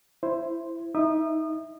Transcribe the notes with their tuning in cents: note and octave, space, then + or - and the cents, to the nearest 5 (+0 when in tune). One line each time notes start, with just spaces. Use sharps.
E4 +15 C5 +0
D#4 +20 E5 +0 D#6 -30